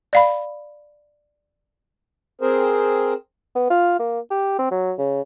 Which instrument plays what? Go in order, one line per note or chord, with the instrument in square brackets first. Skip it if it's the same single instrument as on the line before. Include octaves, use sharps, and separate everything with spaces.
[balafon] D5 F5 B5
[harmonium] C4 G#4 A#4 C5
[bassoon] B3
F4
A#3
G4
C4
F#3
C#3